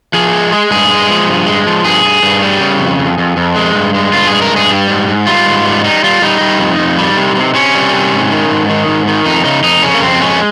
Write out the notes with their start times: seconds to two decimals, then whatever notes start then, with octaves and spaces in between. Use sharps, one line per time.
0.13 F3 G#4
0.33 G#3
0.52 G#3
0.71 G2 G#4
0.90 G#3
1.10 F3
1.29 G2
1.46 G#3
1.67 F3
1.85 G2 G#4
2.05 G2
2.22 G2
2.42 G3
2.61 C#3
2.80 F2
2.99 F2
3.18 F2
3.37 F2
3.56 G#3
3.75 G2
3.95 G#3
4.13 G2 F4
4.27 G#3 G#4
4.42 A#4
4.52 G2 G#4
4.71 G3
4.89 G#2
5.08 G#2
5.27 G3 F4
5.46 G#2
5.65 G3
5.84 G3 D#4
6.04 G3 F4
6.22 G3 D#4
6.41 G3
6.60 F2
6.79 F2
6.98 G3
7.17 C3
7.36 C3
7.54 C3 C#4
7.75 G3
7.93 C3
8.12 G#2
8.32 D#3
8.51 G#2
8.70 D#3
8.88 G#2
9.08 D#3
9.26 F2 D#4
9.45 C#3 D#4
9.63 F2 D#4
9.83 C#3 C#4
9.94 A#3
10.02 F2 C4
10.21 G#3 C#4